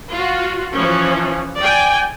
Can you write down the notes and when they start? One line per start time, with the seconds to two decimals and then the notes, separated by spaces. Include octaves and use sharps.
0.12 F4 F#4
0.76 E3 F3 C#4
1.59 D5 G5 G#5